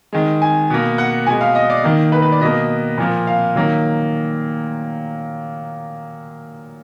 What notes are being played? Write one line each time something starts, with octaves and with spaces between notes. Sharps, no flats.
D#3 G#3
G#5
B2 A#3
F#5
B2 G#3 G#5
F5
D#5
D5
D#3 A#3
B4
B4
D5
B2 A#3 D#5
A#2 F3 A#3
F5
D#3 F#3 A#3